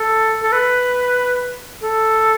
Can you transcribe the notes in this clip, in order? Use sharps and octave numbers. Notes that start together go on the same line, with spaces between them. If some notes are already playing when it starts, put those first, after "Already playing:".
Already playing: A4
A4
B4
A4